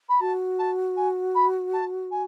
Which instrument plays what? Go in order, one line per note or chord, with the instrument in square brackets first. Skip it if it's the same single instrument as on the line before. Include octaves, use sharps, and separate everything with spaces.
[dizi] B5
[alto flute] F#4 [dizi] A5
[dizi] A5
G#5
B5
A5
G#5